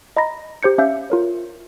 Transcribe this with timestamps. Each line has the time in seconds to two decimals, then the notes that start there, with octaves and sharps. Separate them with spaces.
0.17 D#5 A#5 B5 A#6
0.63 G4 C5 G6 C#7
0.78 C#4 E5 F5 G6
1.10 F4 A#4 C#5